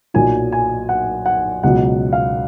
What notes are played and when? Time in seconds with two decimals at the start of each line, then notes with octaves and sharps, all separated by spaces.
0.14 B1 A#2 F#3 G#5
0.52 G#5
0.89 F#5
1.26 F#5
1.63 C#2 B2 F#3 F#5
2.13 F5